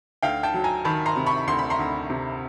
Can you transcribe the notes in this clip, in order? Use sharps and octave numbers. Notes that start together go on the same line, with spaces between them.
D2 F5 G5
G5 A5
F#3
G#5 A#5
D#3 A5 B5
A#5 C6
C3
B5 C#6
D2 C6
B5
A#5 C6
D2
C3